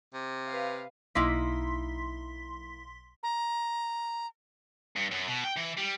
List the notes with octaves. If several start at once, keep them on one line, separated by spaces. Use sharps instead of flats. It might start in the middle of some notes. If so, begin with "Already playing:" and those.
C3
B4 F5
B1 A#3 D#4 E4 C6 B6
A#5
G2
F#2
B2
G5
E3
G3